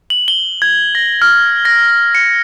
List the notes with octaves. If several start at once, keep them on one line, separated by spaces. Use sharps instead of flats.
F#7
G7
G#6
A#6
F6
A#6
C#7